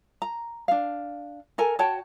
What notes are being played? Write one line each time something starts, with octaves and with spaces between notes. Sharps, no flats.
A#5
D4 F5
A4 A#4 G#5
F#4 C#5 G5 A5